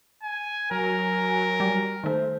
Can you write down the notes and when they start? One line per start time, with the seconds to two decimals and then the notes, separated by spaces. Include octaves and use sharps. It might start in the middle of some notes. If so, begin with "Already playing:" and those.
0.23 G#5
0.71 F#3 A#4 G#5
1.60 G3
2.04 D#3 A3 C5